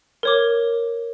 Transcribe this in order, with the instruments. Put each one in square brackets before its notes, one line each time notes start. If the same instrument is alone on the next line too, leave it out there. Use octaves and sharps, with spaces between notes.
[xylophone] A#4 C#5 D6